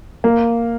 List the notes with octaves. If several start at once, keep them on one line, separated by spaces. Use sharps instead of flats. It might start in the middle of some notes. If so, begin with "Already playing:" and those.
A#3